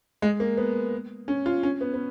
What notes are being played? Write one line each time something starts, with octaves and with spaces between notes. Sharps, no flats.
G#3
A#3
B3
C#4
F4
C#4
B3
B3